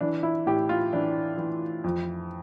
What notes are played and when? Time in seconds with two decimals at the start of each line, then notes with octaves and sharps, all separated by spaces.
0.01 E3 D4
0.23 E4
0.46 A2 G4
0.69 F4
0.93 E3 D4
1.38 E3
1.84 F2